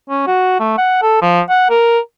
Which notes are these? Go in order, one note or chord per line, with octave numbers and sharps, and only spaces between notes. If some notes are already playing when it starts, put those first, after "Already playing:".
C#4
F#4
A3
F#5
A4
F3
F#5
A#4